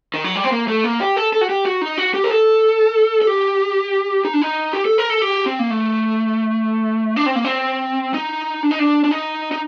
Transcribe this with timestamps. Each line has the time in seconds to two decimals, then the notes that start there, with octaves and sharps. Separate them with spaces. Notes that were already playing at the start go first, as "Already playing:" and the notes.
0.14 D#3
0.24 F#3
0.36 G3
0.44 C4
0.52 A#3
0.68 A3
0.84 A#3
1.01 G4
1.17 A4
1.33 A4
1.41 F#4
1.49 G4
1.65 F#4
1.82 D#4
1.98 F#4
2.14 G4
2.24 A#4
2.30 A4
3.22 A4
3.27 G4
4.25 D#4
4.33 D4
4.41 D#4
4.73 G4
4.86 A4
4.98 A#4
5.10 A4
5.22 G4
5.46 C4
5.59 A#3
5.70 A3
7.16 D4
7.26 C4
7.35 A#3
7.45 C4
8.14 D#4
8.63 D4
8.71 D#4
8.79 D4
9.04 D4
9.11 D#4
9.52 D#4